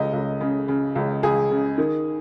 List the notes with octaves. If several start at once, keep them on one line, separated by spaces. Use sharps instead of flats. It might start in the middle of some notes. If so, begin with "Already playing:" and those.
Already playing: C#2 D#5
C#2
C#3
C#3
C#2
C#2 G#4
C#3
D#3